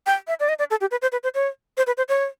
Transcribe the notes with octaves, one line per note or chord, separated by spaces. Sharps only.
G5
E5
D5
D#5
D5
A4
G4
B4
C5
B4
C5
C#5
C5
B4
C5
C#5